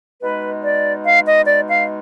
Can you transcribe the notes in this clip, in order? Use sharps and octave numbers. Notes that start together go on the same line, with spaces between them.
B2 G#3 D#4 B4
D5
F5
D#5
D5
F5